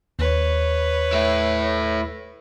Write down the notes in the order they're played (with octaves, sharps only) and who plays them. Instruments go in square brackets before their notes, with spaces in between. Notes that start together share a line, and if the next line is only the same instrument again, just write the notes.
[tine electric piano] D#2 [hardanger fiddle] B4 C#5
[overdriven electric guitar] A3 E4